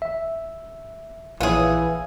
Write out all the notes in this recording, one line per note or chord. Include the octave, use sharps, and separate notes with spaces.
E5
A#1 E3 B3 G#4 C#5 F5